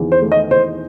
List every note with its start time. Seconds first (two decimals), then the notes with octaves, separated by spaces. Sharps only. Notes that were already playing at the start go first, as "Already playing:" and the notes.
Already playing: E2 D#3
0.12 C5
0.22 D#3 A3
0.32 D#5
0.50 E2 C5